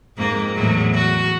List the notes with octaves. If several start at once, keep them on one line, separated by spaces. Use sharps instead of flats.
F2 G#2 A#3
E2 A2 F#3
F#4